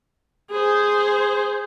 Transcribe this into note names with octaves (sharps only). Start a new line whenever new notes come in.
G#4 C5